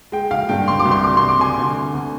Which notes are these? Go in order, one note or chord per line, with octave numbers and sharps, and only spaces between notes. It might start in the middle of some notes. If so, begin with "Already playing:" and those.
G#3 G5
F5
G2 G5
C6
D6
C2
C6
D6
C3 C6
D6
G#5 C6
D2
D2